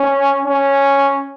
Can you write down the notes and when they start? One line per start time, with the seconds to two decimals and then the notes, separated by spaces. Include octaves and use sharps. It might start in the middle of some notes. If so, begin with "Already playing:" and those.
Already playing: C#4
0.45 C#4